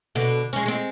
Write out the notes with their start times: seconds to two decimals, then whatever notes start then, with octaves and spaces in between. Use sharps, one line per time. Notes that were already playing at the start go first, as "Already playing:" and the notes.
0.15 B2 D3
0.53 G#3 C#4
0.66 G#3 C4